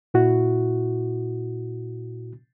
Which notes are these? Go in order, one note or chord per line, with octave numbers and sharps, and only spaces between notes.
A#2 E4 F#4